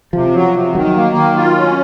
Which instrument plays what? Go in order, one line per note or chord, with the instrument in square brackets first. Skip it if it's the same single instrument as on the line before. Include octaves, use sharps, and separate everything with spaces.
[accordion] C3 [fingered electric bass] F3
[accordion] F#3
C3
[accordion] D#3 [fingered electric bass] F#3
[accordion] A#3
D#3
F4
C#4